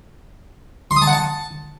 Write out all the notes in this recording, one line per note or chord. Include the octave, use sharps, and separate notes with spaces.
C6
D#6
A5
F#5
A5